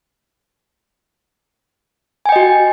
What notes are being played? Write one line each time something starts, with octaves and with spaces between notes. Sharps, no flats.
F#4 D#5 G5 G#5